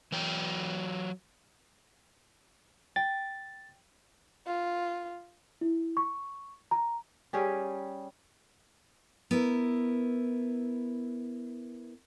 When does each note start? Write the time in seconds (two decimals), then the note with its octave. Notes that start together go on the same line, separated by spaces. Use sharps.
0.12 E3 F#3 G5
2.96 G5 A6
4.46 F4
5.61 E4
5.97 C#6
6.71 A#5
7.33 G3 C#4 G4 G#4
9.31 B3 E4 A#4